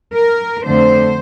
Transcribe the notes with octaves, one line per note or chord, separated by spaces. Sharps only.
A#4
F2 D3 A3 C5